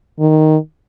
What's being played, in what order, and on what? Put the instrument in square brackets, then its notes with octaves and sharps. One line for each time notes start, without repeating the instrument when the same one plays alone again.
[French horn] D#3